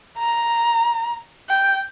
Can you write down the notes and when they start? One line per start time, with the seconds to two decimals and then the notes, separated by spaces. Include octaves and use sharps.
0.19 A#5
1.49 G5